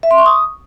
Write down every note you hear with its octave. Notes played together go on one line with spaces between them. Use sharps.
E5
C6
C#6
D#6